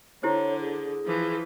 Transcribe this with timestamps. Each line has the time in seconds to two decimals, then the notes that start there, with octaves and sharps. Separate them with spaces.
0.23 D3 E4 G4 C5 C#5
0.60 G#4
1.06 E3 F3